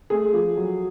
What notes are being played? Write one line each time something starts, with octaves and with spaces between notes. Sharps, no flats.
A3 G#4
F3
F#3